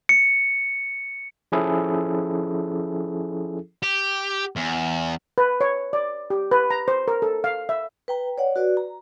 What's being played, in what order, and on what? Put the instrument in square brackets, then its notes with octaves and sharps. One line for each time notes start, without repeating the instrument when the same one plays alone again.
[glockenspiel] C#7
[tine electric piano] F3 C#4 E4 G#4 A4
[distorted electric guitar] G4
E2
[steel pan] B4
C#5
D5
G4
B4
A#5
C5
A#4
A4
F5
E5
[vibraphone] B4 G5 A#5
C#5 D5 F#5
F#4 B4 D5
A#5